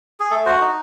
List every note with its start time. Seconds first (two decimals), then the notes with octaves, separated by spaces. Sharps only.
0.20 G#4
0.31 A3 A4
0.46 F#4 C5
0.61 D#4